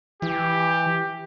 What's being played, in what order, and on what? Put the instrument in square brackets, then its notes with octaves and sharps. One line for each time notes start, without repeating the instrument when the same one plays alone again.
[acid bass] E3 [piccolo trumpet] G4